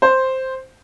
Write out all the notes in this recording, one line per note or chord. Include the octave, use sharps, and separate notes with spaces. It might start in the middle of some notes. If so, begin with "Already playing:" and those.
C5